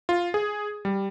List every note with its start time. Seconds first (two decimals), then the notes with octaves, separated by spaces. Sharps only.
0.09 F4
0.34 G#4
0.85 G3